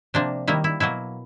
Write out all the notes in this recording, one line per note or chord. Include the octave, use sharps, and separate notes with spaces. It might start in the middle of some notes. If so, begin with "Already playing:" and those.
C3 F3 A#3 D4
D#3 G3 A#3 E4
E4
B2 F#3 A#3 E4